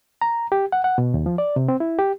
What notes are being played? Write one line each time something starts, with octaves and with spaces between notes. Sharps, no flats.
A#5
G4
F#5
F#5
B2
D#2
F3
D5
C3
C4
E4
G4